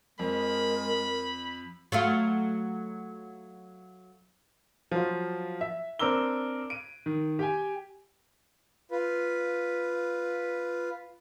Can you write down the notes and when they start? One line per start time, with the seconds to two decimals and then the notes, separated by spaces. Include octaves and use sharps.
0.19 F2 G#3 A#4 B5
1.92 F#3 A3 F4
4.92 F3 F#3 F4
5.61 E5
5.99 C4 D4 A#4 D6 E6 G7
6.70 D7 D#7
7.06 D#3
7.39 G4 G5 G#5
8.91 F4 B4